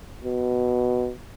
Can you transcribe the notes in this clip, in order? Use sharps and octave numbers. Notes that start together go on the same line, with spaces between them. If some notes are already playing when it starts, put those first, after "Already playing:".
B2